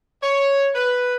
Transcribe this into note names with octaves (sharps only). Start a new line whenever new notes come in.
C#5
B4